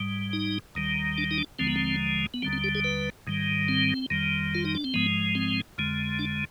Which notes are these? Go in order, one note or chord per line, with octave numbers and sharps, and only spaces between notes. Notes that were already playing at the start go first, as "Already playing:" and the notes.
Already playing: G#2 G3
D#4
D#2 D#3 G3
D4
D#4
D4
D#2 D3 F3 G#3 C4
B3
C4
B3
D#2 D3 G3 C4
C4
G4
G#4
B4
G#2 D#3 G3
C4
F2 D#3 G3
F4
D#4
D4
C4
G#2 F3 G#3 B3
C4
F2 D3 G#3
D4